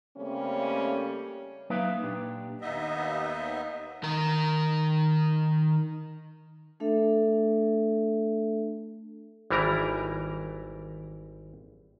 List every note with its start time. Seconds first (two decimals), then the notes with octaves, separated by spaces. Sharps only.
0.17 C#3 G3 A3 A#3 C4 C#4
1.70 F#3 A#3 D#4 B4 E5 F5
2.04 A#2 D4 G4
2.61 D#2 B3 D#4 D#5 E5
4.04 D#3 A#4
6.80 A3 D4 A4 E5
9.50 G#1 E3 G3 E4 A#4 A#5